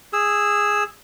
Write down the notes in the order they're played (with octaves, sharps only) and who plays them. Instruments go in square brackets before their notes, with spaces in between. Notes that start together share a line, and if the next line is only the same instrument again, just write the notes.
[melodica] G#4 E6